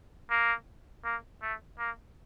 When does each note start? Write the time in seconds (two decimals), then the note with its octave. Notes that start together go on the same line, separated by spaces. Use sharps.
0.30 A#3
1.04 A#3
1.42 A3
1.79 A#3